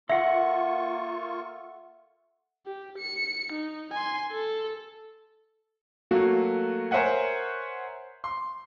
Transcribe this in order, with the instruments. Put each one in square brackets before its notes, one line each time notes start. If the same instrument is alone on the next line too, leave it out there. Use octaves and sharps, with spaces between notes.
[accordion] A#3 F4 C#6 [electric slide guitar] A4 F#5 [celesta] E5
[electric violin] G4
C#7
D#4
G#5 C6
A4
[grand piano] F#3 A3 A#3 F#4
A#4 C5 C#5 E5 F#5 G#5
C6